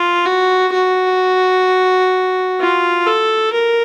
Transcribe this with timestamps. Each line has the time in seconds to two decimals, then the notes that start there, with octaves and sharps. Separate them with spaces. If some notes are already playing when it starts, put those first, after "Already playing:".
Already playing: F4
0.25 F#4
0.73 F#4
2.61 F4
3.07 A4
3.53 A#4